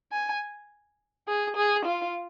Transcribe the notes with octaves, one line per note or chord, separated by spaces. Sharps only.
G#5
G#4
G#4
F4